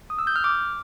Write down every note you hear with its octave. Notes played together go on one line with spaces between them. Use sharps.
D#6
E6
G6
F6
D6